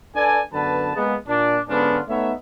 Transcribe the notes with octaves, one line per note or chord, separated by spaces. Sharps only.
D4 A4 B4 D5 G#5
F#2 D3 B3 B4 A5
G#3 A#3 B3
A#2 D4
G#2 D3 B3 C#4 D4 F4
A3 B3 D#4 C#5 E5